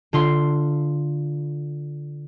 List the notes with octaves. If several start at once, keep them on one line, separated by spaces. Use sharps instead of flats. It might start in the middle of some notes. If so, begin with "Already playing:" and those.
D3 F4 C6